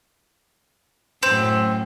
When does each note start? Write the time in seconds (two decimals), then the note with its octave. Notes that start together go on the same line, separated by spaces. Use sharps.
1.23 F#2 A2 C4